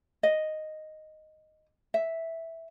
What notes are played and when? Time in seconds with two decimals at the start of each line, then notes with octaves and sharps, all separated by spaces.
0.23 D#5
1.94 E5